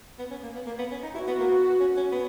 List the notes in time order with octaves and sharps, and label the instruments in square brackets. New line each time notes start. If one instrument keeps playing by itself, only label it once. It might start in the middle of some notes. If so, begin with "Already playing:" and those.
[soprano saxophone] B3
C#4
A#3
B3
A#3
B3
C#4
D#4
[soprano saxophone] E4 [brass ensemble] F#4
[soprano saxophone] B3
A#3
B3
C#4
C#4
B3